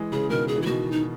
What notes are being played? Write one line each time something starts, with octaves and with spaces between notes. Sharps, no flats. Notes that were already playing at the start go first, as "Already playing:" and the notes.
Already playing: E3 G#3
C#3 E3 G#4
B2 D#3 A#4
G#4
E3
E4
B2 D#3 F#4
D#4